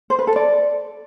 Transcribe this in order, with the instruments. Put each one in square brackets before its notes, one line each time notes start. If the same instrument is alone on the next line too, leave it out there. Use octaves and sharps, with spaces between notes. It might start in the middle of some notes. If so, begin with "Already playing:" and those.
[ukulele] C5
B4
A4
D5